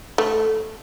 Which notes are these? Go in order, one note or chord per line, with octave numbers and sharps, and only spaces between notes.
A3